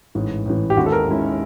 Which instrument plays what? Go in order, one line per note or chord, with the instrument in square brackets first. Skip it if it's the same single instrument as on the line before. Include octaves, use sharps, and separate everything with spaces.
[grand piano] A1 G#2 E3
A1 G#2 E3
[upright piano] G4
[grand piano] D#2 D#3 G#3 C#4 E4 [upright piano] F#4
[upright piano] A4
A#4
[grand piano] D#2 D#3 G#3 C#4 E4